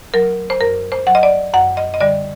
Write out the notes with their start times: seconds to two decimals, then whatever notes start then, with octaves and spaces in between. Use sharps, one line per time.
0.14 F#3 A#4
0.50 C5
0.61 F#2 A#4
0.92 C5
1.07 F#3 F#5
1.15 D#5
1.23 D5
1.54 F#2 F#5
1.77 D#5
1.94 D#5
2.01 D3 G3 D5